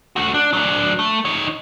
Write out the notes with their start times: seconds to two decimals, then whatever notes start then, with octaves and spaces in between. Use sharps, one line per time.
0.16 A3 F#4
0.34 D4
0.53 F#3 D4
0.99 A3
1.25 D#4 C#5